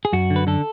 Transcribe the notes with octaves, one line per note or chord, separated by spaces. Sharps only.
G#4
F#2 F#4
D3
B4
D3 A4